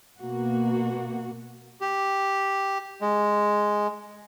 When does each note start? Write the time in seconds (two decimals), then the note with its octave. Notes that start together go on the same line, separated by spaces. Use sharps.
0.18 B2 A#3 F#4
1.81 G4
3.01 G#3